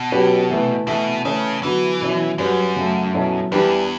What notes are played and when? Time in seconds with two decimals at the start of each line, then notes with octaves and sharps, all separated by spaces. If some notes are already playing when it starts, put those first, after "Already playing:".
Already playing: B2
0.12 F#3 C#4 G4 B4
0.50 E3 A3 E4 B4
0.87 B2 E3 A3 E4
1.25 C#3 E3 A3 C#4
1.63 D3 E3 F#3 B3 F#4
2.01 B2 F#3 C#4 E4
2.38 F#2 G3 C#4 F#4 B4
2.76 C#3 F#3 A3
3.14 B2 F#3 C#4 E4 A4
3.52 E2 E3 G3 D4 G4 B4